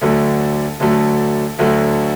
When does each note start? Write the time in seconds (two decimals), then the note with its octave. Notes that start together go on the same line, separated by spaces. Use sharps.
0.01 D2 D3 F#3 A3
0.80 D2 D3 F#3 A3
1.58 D2 D3 F#3 A3